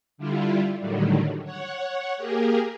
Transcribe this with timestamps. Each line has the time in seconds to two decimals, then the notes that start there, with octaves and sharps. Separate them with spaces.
0.18 D3 G3 E4 F4
0.79 A2 D3 D#3 F#3 G3
1.44 C#5 F#5
2.17 A#3 G4 G#4 A#4